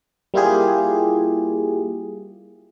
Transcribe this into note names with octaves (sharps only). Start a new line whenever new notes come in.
G3 A#3 E4 F4 G4 G#4